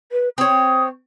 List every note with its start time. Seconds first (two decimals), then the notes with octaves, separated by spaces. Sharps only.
0.12 B4
0.38 C4 C#5 D#6